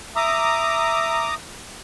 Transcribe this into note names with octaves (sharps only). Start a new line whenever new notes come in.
E5 A#5 D6 D#6